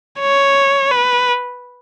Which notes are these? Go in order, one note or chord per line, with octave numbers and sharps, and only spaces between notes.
C#5
B4